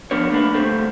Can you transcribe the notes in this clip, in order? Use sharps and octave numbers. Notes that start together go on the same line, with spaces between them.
F3 B3 D4 A#4 C#5
A2 A#3 D4 B4
D2 A#2 G3 A3 C4